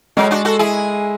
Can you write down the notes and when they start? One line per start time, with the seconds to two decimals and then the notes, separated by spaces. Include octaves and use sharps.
0.17 F#3 G#3 A3
0.31 D4 F#4
0.45 F#4 A4
0.59 E4 G#4